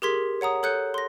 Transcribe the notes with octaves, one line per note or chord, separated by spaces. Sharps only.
G4 G#4 A#4 C6 G#6 B6
C#5 F#5 A#5 D#6
A4 C#5 F#6 G6 C#7
C6 A#6